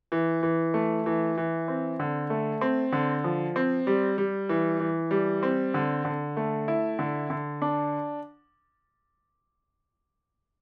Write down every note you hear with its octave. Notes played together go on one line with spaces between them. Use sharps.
E3
E3
A3
E3
E3
C4
D3
A3
C4
D3
F3
C4
G3
G3
E3
E3
G3
C4
D3
D3
A3
E4
D3
D3
D4